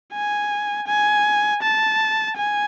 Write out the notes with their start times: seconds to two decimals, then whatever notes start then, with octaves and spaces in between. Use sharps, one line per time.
0.14 G#5
0.87 G#5
1.62 A5
2.37 G#5